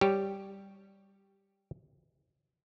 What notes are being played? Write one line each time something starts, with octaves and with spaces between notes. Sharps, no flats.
G3 G4 C#5